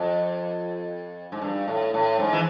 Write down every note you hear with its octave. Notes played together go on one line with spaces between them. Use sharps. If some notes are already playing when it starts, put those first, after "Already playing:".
Already playing: F2
G#2
G2
A2
A2
G#2
E3